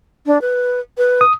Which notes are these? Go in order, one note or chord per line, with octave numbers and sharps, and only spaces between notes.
D4
B4
B4
D#6